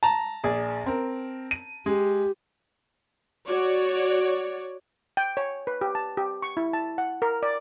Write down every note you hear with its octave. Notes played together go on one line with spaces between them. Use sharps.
A5 A#5
A#1 G#4 D5
C4 A#4
D#7
G#3 G4
F#4 C#5 D5
G5
C#5
B4
G4
A5
G4
C#6
E4
A5
F#5
A#4
D5